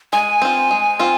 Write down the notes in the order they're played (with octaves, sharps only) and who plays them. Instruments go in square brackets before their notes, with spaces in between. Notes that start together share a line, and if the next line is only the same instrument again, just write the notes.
[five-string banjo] G#3 [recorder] G#5
[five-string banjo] C4 F4
G#3
C4 F4